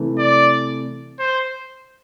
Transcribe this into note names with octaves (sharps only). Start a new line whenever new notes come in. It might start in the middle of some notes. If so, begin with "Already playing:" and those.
Already playing: C3 E3 A3
D5
C5